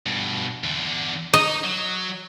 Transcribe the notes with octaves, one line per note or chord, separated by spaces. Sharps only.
G2 B2
E2 D3
D#4 D#5
F#3